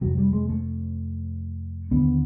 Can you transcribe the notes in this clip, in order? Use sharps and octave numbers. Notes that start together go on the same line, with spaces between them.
F2 C3 F#3
G3
G#3
A3
D#2 D3 B3